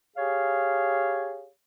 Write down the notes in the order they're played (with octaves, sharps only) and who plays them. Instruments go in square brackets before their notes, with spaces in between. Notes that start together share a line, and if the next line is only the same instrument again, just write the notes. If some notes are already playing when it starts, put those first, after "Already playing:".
[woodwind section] G4 G#4 C#5 F5